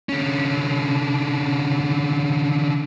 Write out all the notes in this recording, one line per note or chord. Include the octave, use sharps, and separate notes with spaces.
D3 C#4